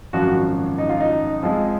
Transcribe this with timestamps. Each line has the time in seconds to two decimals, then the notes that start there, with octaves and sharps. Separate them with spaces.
0.13 G#1 F#2 F3 F#4
0.78 D#4
0.89 F4
1.00 D#4
1.42 F2 F3 G#3